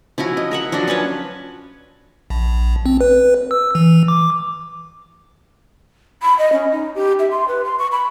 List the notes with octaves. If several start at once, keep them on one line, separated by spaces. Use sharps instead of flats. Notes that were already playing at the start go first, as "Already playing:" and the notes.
F3 C#4 E4 F#4
D#5
A#4 E5 F#5
F3 F#3 D4 F#4
C#4 B4 C#5 A5
A#1
C4
B4
E6
E3
D6
B5
D#5
C#4
D#4
G4
E5
C6
B4
C6
C#6
B5